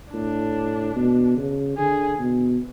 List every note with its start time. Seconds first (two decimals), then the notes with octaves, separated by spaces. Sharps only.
0.13 A2 D4
0.96 B2
1.37 C#3
1.78 D3 G#4
2.19 B2